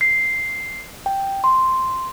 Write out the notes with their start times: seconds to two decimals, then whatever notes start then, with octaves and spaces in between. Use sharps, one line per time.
0.01 C7
1.06 G5
1.44 C6